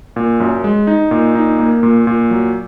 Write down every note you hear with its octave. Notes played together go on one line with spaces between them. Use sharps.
A#2
F#2
G#3
D#4
A#2
D#4
A#3
A#2
A#2
F#3